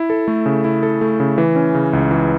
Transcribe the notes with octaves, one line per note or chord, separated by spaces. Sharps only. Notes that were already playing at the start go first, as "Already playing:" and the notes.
Already playing: E4
A4
A3
C#3
E4
A4
A3
C#3
E3
C#4
C#3
C#2
E3